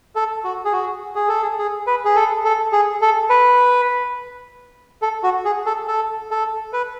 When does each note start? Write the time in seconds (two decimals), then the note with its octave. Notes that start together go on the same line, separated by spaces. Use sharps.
0.16 A4
0.44 F#4
0.65 G#4
0.72 F#4
1.15 G#4
1.28 A4
1.42 G#4
1.58 G#4
1.87 B4
2.05 G#4
2.16 A4
2.44 A4
2.72 G#4
3.01 A4
3.30 B4
5.02 A4
5.23 F#4
5.45 G#4
5.66 A4
5.88 A4
6.31 A4
6.73 B4